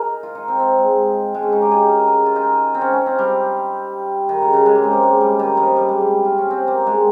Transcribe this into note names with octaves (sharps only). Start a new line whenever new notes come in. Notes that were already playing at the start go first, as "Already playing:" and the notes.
Already playing: D#4 G#4 A#4
F4
D#4
C4
C4
G#3
G#3
C#4
D#4
G4
G#4
A#4
G#4
F4
D#4
C4
C#4
C#4
C4
G3
D#3
C#3
C#3
G#3
A#3
C4
A#3
G#3
G3
D#3
F3
G3
G#3
G3
F4
C#4
C4
A#3
G#3